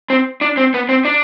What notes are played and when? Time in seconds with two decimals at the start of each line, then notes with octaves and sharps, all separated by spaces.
0.10 C4
0.41 D4
0.57 C4
0.74 B3
0.89 C4
1.05 D4